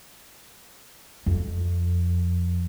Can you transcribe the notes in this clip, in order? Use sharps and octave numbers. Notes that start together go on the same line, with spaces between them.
F2